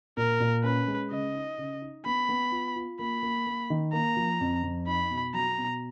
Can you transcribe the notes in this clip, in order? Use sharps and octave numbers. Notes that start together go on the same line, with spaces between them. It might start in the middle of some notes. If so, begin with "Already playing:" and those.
A#2 A#4
A#2
C#4 B4
G#3
C#3 D#5
D#4
C#3
D#4
B3 B5
B3
F4
F4
A#3 B5
A#3
A#3
D#3
A#3 A#5
F3
F2
F2
D#4 B5
B2
F#3 A#5
B2